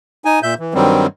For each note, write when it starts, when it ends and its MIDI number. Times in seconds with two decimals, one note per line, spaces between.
0.25 0.39 63
0.25 0.39 80
0.43 0.54 46
0.43 0.54 76
0.43 0.54 91
0.59 0.74 52
0.74 1.07 43
0.74 1.07 51
0.74 1.07 54
0.74 1.07 55
0.74 1.07 60